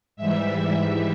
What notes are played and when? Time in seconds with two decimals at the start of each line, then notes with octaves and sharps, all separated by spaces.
0.16 G#2 E3 G3 E5
0.79 E5